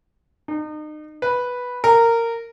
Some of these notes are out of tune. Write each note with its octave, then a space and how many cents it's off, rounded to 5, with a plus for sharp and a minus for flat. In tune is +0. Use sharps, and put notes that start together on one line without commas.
D#4 -35
B4 -5
A#4 -15